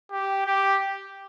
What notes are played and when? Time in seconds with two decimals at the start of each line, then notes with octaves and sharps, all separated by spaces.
0.11 G4
0.46 G4